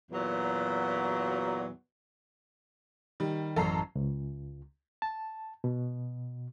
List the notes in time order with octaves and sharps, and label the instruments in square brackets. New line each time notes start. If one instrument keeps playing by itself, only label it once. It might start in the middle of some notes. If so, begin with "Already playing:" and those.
[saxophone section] E2 A#2 F#3
[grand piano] D#3 [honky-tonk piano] G3
[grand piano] A1 F#2 [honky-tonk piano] A4 A#5 C7
[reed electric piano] C#2
A5
B2